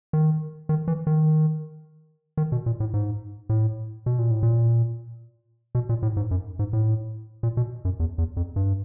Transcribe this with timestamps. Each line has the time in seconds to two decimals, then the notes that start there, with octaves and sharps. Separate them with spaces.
0.13 D#3
0.69 D#3
0.88 E3
1.07 D#3
2.37 D#3
2.52 B2
2.66 A#2
2.80 A2
2.94 G#2
3.49 A2
4.06 B2
4.19 A#2
4.31 A2
4.43 A#2
5.75 B2
5.89 A#2
6.03 A2
6.17 G#2
6.31 F#2
6.59 G#2
6.73 A2
7.43 A#2
7.57 B2
7.85 F#2
8.00 E2
8.18 E2
8.37 F2
8.56 G2